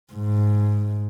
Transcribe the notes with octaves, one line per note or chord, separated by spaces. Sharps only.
G#2